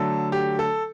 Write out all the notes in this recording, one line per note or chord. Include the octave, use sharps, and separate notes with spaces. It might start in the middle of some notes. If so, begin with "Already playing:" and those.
Already playing: D3 F#3 A3 A4
G4
A4